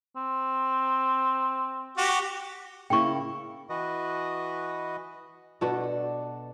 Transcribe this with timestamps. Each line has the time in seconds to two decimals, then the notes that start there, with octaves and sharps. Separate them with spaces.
0.16 C4
1.97 F#4 G4
2.90 C#3 A#3 E4 G5 C#6
3.69 E3 F#4 B4 D#5
5.61 B2 D4 F#4 A4